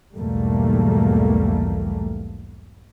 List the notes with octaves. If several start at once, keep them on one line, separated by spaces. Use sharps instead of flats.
B1 E2 G#2 G3 A3 A#3